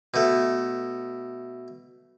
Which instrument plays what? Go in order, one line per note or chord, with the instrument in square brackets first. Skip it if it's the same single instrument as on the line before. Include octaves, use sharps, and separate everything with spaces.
[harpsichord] B2 A3